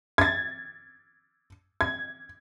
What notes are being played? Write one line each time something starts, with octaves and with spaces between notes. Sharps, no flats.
G#6 A6
G#6